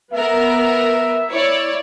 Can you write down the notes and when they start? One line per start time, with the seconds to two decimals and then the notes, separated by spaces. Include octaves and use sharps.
0.13 B3 A#4 E5
1.28 E4 C#5 D5